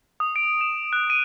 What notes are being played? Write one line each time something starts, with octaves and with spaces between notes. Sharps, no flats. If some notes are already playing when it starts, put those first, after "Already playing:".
D#6
D7
E7
F#6
D#7